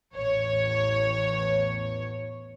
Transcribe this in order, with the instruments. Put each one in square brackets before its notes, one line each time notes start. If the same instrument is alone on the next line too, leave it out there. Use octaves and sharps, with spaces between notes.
[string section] A1 E2 C#5